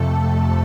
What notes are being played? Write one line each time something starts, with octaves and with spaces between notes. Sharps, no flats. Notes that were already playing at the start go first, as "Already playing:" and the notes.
Already playing: F2 C3 A3 A4